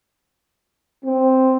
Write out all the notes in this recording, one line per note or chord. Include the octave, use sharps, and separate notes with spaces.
C4